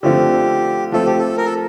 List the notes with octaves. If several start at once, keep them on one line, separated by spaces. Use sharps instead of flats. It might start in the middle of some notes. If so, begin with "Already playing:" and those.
D3 F3 A3 C4 F4 G4
F3 A3 C4 A4
G4
A4
A#4
A4